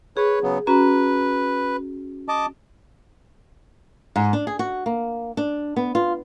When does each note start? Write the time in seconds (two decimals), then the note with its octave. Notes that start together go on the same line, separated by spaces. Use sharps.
0.17 G#4 B4 C#5
0.43 C#3 F#3 B3
0.67 C#4 F#4 B4 A#5
2.29 D#5 A5 D6
4.16 G#2
4.33 D4
4.47 G#4
4.59 F#4
4.86 A#3
5.37 D4
5.76 B3
5.95 F4